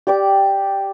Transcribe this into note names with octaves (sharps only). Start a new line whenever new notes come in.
G4 D5 D6